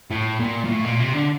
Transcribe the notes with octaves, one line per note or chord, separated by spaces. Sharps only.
A2
A#2
A#2
A2
A#2
C3
D3